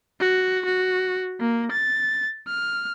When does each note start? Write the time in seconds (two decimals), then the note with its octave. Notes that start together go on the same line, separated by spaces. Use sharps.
0.20 F#4
0.65 F#4
1.40 A#3
1.72 A6
2.47 F6